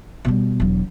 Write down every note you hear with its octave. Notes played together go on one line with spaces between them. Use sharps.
B2 G3
E1 F#3